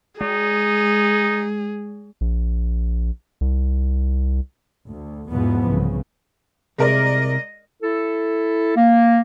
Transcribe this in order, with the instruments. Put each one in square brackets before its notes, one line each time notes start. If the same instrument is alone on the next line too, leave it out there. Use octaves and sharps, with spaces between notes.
[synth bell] G#3 [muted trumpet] D#4 [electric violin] G#4
[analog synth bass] A#1
C2
[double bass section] D2
E2 G#2 B2 E3 F3 B3
C2 C#3
[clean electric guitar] C2 C3 [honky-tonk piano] G#3 A#4 D5 [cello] D#5
[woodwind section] E4 A4
A#3